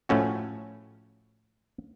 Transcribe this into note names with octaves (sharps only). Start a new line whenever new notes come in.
A2 F3 A3 C#4 F#4